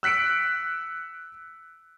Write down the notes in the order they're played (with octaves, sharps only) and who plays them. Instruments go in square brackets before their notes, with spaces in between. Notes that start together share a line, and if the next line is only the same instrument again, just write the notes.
[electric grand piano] E6 F#6 B6 C#7 D7